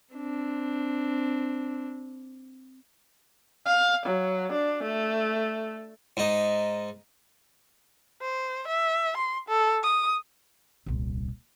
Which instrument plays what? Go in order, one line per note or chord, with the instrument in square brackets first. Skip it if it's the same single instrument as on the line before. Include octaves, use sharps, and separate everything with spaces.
[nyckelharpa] C4 D4
[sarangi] F5
F#3
D4
A3
[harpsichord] G#2 D#4
[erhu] C5
E5
C6
A4
D#6
[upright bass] D#1 C2